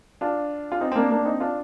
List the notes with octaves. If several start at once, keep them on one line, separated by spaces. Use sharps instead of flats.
D4 F4
F4
C4 D#4
C4
A#3 D4
A#3 D4
C4 D#4
D4 F4